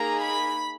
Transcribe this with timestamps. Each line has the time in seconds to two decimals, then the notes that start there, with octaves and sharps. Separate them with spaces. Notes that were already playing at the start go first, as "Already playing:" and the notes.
Already playing: A#3 D#4 G#4 A#5
0.23 B5